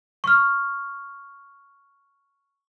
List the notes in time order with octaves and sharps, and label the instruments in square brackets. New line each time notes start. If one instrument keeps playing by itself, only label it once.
[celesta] C#6 F6